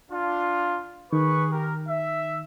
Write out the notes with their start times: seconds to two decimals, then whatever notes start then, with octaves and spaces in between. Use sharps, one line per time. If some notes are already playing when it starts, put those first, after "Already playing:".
0.10 D4 F4
1.12 D#3 G#4 B4 C#6
1.52 G4 A#4
1.89 E5